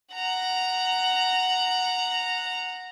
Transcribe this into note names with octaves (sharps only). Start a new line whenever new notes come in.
F#5 A#5